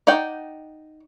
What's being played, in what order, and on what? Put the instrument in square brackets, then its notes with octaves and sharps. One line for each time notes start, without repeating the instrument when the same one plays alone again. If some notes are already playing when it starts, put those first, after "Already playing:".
[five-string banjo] D#4 D5 F#5 G5